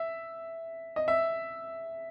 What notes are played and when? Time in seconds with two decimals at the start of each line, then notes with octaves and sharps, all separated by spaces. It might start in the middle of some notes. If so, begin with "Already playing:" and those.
Already playing: E5
0.96 D#5
1.08 E5